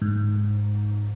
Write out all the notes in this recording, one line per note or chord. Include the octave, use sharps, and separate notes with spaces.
G#2